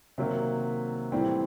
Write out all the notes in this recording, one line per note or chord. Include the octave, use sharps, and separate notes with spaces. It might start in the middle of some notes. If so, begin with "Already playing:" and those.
C3 D#3 F#3 A#3
A2 E3 G3 C4